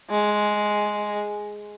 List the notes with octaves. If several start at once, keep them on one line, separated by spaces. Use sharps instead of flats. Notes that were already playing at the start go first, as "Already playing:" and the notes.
G#3